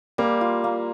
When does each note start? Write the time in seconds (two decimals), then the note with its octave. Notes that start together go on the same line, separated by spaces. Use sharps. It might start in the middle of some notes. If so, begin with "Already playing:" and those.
0.18 G3 A#3
0.41 F4
0.64 A#3